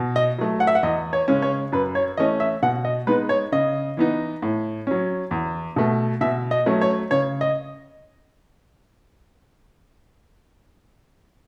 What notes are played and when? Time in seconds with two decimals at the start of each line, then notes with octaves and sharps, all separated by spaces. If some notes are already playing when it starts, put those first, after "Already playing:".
Already playing: B2
0.16 D#5
0.38 F#3 A3
0.60 F#5
0.67 E5
0.75 F#5
0.83 E2 D#5
1.13 C#5
1.28 C#3 G#3 C#4
1.42 C#5
1.72 F#2 B4
1.95 C#5
2.17 E3 A3 C#4 D#5
2.40 E5
2.62 B2 F#5
2.85 D#5
3.07 G#3 B3 D#4 B4
3.29 C#5
3.52 C#3 D#5
3.97 E3 B3 D#4
4.42 A2
4.87 F#3 C#4
5.31 E2
5.76 B2 A3
6.21 B2 E5
6.51 D#5
6.66 F#3 A3 C#4
6.81 C#5
7.11 C#3 C#5
7.41 D#5